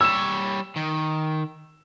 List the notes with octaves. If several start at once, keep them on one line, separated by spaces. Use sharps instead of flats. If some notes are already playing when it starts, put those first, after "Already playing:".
G3 C#5 E6 E7
D#3